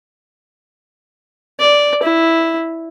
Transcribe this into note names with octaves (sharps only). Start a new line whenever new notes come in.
D5
E4